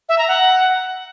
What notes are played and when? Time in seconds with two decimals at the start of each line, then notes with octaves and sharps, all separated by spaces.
0.09 E5
0.18 A#5
0.28 F#5